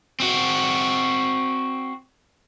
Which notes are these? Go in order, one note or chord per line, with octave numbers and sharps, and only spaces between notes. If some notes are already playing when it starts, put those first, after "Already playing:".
C4 F#4